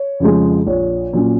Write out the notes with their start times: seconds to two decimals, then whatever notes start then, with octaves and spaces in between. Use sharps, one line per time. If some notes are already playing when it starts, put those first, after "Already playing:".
Already playing: C#5
0.20 F2 C#3 F3 G#3
0.67 A#1 C#5
1.13 A#2 F#3 C#4